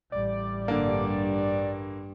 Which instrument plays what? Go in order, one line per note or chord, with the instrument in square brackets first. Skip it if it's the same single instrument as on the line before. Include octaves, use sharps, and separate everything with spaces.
[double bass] A1 G3 [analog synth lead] D5
[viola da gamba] G2 [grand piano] D3 A#3